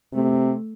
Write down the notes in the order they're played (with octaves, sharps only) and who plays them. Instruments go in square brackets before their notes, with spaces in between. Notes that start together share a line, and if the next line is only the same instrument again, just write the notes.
[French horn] C3 [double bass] A3